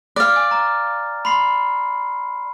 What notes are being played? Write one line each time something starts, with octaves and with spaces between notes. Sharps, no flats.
D5 F5 F6 F#6
G#5
A#5
B5 C6 C7